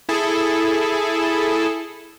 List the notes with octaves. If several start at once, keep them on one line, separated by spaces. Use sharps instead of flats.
E4 G#4 A4